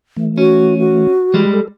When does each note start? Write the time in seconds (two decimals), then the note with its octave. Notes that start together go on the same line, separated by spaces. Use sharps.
0.17 E3 A3
0.38 C#4 F#4
0.79 F#4
1.34 E3 G3 G#3
1.54 A4